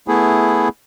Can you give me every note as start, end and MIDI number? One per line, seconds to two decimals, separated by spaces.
0.08 0.69 57
0.08 0.69 59
0.08 0.69 64
0.08 0.69 68